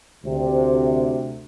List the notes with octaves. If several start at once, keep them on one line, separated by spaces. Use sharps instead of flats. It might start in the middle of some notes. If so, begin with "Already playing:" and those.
D2 C3